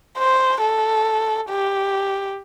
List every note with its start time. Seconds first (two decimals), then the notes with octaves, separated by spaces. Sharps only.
0.18 C5
0.62 A4
1.50 G4